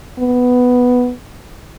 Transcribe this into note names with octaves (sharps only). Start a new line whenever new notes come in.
B3